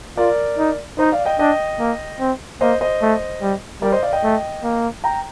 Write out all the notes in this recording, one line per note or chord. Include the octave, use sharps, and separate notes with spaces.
F4 A#4 D5
D#4
D#4 C5 D#5
D5 F5
D#5 G5
D4 D#5 G5
A#3
C4
A#3 C5 D#5
C5 D#5
A3
G3
G3 A#4 D5
C5 D#5
D5 F5
D#5 G5
A3
A#3
G5 A#5